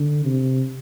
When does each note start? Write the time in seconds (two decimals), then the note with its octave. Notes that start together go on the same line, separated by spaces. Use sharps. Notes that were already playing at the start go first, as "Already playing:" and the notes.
Already playing: D3
0.25 C3